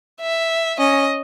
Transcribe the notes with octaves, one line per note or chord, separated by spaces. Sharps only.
E5
C#4 D#5